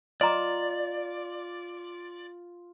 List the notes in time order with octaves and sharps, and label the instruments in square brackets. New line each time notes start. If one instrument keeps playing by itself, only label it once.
[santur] F4 [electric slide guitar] D5 [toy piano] D#5 A#5 D6